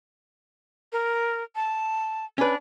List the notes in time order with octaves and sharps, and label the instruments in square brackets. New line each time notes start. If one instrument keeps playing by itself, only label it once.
[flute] A#4
A5
[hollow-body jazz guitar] C#4 B4 [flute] D4